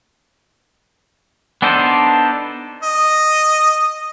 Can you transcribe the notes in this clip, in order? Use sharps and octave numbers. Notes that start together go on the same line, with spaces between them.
B3 D4 D#4 A4 C5
D#5